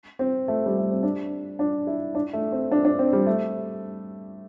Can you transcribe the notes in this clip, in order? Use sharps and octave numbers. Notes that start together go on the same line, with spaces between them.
C4
A3
G3
A3
C4
D4
D4
E4
D4
A3
C4
D4
D4
C4
G3
A3